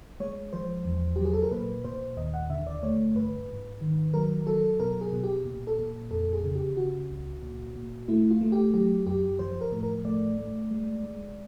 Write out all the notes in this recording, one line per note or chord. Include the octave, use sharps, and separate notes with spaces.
G#3 C#5
F3 C5
E2
F#3 G4
G#4
A4
A#4
A#2 B4
A#2 C5
D#2 D#5
F#5
D3 E5
D5
A3 C#5
G2 B4
G#2
D#3
F#3 A#4
F#3 A4
B2 A#4
G#4
B2
G4
A#2
A4
A#2
F2 A4
G#4
C#3
G4
C#3 F#4
C#2
A#2
A#2
A3 E4
F4
A3
G4
F#3 G4
F#2 G4
F3 C5
A#4
A2
A#4
A3 D5
A3
G#3
G#3